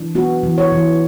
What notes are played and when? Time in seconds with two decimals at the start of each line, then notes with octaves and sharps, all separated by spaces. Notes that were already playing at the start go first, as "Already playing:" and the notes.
Already playing: E3 D4
0.15 B3 F#4
0.43 E3
0.58 C#5
0.72 E3